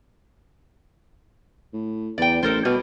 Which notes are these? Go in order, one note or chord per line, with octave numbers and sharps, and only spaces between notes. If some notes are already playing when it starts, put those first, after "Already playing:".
A2
E2 D5 G5
A1 A4 A#4 C5
B2 G3